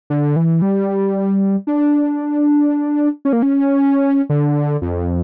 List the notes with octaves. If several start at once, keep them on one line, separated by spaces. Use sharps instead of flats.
D3
E3
G3
D4
C#4
A#3
C#4
D3
F2